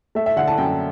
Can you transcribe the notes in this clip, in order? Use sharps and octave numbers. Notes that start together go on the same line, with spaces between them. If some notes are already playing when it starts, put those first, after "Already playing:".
A3 E5
E5
D3 F#5
A5
F#2 G5